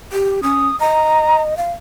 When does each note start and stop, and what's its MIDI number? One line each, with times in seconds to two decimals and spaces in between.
0.12 0.40 67
0.43 0.68 61
0.43 0.76 87
0.81 1.57 75
0.81 1.41 82
1.57 1.72 77